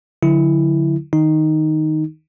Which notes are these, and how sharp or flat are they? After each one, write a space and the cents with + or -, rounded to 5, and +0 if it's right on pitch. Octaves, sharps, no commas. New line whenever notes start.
D3 +0 F#3 -30 E4 +0
D#3 +0 D#4 +0